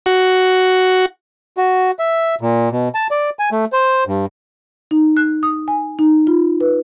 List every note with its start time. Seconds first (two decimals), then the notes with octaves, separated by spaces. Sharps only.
0.06 F#4
1.57 F#4
1.99 E5
2.41 A#2
2.72 B2
2.95 A5
3.11 D5
3.39 G#5
3.52 A3
3.73 C5
4.07 G2
4.91 D#4
5.17 F#6
5.43 D#6
5.68 G#5
5.99 D#4
6.27 F4
6.61 B4